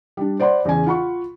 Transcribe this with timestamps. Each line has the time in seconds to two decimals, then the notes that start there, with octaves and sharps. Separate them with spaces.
0.17 G3 D4
0.40 C5 D5 F#5 B5 C6
0.65 E2 C#3 G#5
0.86 F4 F#5 B5 C#6